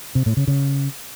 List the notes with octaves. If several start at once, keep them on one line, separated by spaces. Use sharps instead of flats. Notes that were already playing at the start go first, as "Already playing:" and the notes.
C3
A2
C#3
C#3